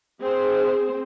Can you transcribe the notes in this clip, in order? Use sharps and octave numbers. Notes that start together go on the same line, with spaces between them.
C4 G#4 C5